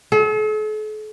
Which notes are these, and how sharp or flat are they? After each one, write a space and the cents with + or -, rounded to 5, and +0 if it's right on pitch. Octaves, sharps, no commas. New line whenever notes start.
A4 -45